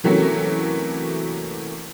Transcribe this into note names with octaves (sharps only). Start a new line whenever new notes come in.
C3 E3 F#3 A3 A#3 C#4